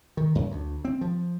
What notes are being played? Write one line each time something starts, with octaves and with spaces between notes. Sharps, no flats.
D#3
F#2
D2
C4
F3